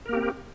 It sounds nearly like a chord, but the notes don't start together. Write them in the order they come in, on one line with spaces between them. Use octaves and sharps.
A#4 A#3 G4 C4